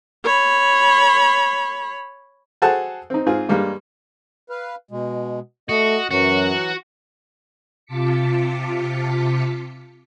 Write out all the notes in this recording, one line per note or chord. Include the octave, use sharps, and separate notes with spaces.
C#5 B5
F#4 G#4 A4 C5 F#5 A5
C4 D#4
G#2 C4 F4 G#4
G2 G3 G#3 A#3
B4 F5
B2 G#3
A3 F#4 D#5
F#2 E3 F#3 F#4
C3 F4 A5 D6 B6 C#7